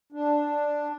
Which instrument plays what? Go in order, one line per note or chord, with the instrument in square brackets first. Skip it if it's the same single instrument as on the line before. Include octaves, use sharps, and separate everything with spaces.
[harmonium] D4